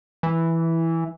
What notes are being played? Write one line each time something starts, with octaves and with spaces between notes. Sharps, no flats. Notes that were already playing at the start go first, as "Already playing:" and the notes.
E3